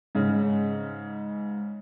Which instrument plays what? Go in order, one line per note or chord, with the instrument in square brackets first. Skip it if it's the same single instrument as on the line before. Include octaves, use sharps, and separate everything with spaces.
[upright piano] G#2 C#3